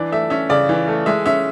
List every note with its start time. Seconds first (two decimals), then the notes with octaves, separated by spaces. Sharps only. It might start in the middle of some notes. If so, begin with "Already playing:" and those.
Already playing: E3 D4 D5
0.12 A3 E5
0.30 C#4 E5
0.49 C#3 D5
0.69 E3
0.88 A3
1.06 G#3 E5
1.26 C#4 E5